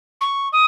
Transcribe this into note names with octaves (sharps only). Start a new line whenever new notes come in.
C#6
D#6